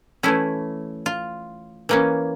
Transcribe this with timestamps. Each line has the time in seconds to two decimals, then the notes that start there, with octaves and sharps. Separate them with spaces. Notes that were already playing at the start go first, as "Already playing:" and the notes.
0.23 E3 A3 C#4 E4
1.06 F4
1.89 E3 A#3 C#4